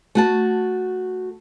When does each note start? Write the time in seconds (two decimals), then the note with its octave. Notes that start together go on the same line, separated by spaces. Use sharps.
0.15 A3 F#4 A5